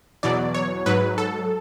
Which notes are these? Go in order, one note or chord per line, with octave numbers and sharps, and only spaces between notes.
E2 B2 F#3 D5
C#5
G#2 F#3 B4
A4